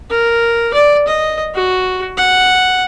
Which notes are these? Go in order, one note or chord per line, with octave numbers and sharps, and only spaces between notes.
A#4
D5
D#5
F#4
F#5